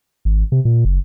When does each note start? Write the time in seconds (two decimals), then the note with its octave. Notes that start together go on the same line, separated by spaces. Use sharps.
0.25 G#1
0.52 C3
0.65 A#2
0.85 F#1